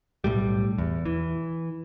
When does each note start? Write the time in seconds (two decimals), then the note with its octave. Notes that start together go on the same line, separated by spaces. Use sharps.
0.24 B1 A2 G3
0.78 E2
1.05 E3